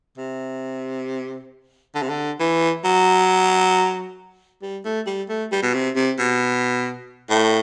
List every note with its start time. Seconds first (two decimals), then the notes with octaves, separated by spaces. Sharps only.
0.18 C3
1.95 D3
2.02 C3
2.09 D3
2.40 E3
2.85 F#3
4.62 G3
4.85 A3
5.07 G3
5.29 A3
5.52 G3
5.62 B2
5.74 C3
5.96 C3
6.19 B2
7.30 A2